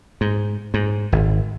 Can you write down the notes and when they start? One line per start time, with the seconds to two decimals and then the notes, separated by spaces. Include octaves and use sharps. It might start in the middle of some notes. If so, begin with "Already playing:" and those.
0.21 G#2
0.74 G#2
1.12 G#1